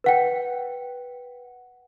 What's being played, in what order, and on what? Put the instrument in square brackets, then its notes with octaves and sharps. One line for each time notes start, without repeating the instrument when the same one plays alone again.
[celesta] B4 F#5 G5